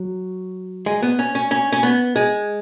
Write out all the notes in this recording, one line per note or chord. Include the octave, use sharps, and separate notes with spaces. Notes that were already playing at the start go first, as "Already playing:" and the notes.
Already playing: F#3
G#3
B3
C#4
C#4
C#4
C#4
B3
G#3